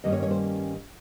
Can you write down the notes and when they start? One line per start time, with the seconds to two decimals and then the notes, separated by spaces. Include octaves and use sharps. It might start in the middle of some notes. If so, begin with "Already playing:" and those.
0.04 G2 D#3 G3 A#3 C#4 D#5
0.12 C#5
0.22 C#5
0.31 C5